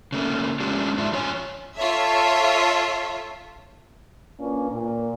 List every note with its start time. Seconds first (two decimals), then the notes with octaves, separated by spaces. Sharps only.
0.12 C#3 A3 A#3
0.60 G#3 A3 C#4 D4 F4 G4
0.97 G#2 D4 F4 E5
1.12 E2 F4 C#5 G#5
1.77 F4 A4 C#5 E5
4.40 A#3 C#4 D4 F4 A#4 B4
4.71 A#2